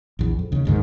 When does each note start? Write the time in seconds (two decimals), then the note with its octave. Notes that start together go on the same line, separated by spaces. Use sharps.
0.19 A#1 E2
0.39 F2
0.52 D#2 C#3
0.65 F#1 G#2 D#3